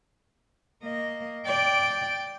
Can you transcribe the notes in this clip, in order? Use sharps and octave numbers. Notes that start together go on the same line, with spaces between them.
A#3 D#5
D5 G5